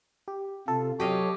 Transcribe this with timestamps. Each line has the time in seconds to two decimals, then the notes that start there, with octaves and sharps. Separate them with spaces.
0.28 G4
0.68 C3 F4 A4
1.00 F#3 G4 A4 C#5 D#5 F5